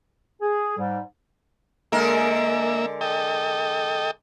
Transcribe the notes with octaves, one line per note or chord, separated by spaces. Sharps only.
G#4
G#2 G3
D3 G#3 A#3 A#4 E5
A4 D#5 G5